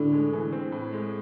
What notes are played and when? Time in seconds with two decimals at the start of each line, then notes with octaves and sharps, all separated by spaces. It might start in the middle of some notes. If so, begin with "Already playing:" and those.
Already playing: A2 D3
0.13 G#3
0.33 E3
0.52 C4
0.72 A2
0.93 G#3